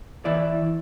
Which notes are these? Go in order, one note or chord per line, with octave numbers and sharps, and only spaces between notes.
E3 E4 D5